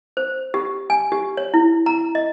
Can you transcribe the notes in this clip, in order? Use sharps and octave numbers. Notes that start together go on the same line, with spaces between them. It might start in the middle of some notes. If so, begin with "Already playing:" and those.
C5
G4
G#5
G4
C#5
E4
A#5
D#5